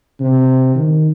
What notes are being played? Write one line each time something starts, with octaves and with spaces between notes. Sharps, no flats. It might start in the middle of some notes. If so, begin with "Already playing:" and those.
C3
D#3